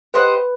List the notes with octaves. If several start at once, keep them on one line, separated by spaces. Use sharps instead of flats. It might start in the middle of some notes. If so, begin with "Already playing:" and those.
G4 B4 C5 D#5 F#5